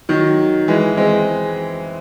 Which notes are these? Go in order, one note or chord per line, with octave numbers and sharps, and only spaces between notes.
D#3 F#3
E3 G#3
G#3 C4